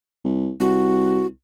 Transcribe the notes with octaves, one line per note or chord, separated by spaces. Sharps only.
C2
C2 F#4